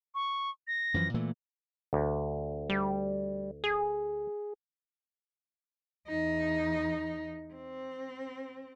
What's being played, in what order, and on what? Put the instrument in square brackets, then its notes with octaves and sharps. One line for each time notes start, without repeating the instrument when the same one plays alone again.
[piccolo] C#6
A#6
[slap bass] F#2 E3 F3
A#2 E3 A3
[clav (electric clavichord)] D2
[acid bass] G3
G#4
[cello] E2 D#4
C4